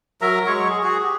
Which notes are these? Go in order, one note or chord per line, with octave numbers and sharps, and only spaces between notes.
F#3 A#4 E5 A#5
F#3 G#3 C#5 C#6
G#4
F#4 G#4
G4